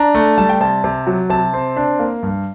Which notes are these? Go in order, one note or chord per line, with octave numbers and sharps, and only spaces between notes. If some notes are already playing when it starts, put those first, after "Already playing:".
Already playing: D4 A#5
A3
G3 A5
G5
C3 A5
C3
F#3
C3 A5
C4
D4
A#3
G2